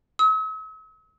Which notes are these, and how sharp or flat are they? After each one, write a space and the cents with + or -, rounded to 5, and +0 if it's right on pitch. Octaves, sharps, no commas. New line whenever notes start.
E6 -45